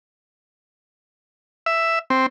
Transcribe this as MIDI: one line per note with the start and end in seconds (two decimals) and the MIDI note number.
1.66 1.99 76
2.10 2.26 60